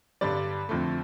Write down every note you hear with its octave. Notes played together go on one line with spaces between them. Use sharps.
G2 D3 G3 D5
F2 D3 F3 A3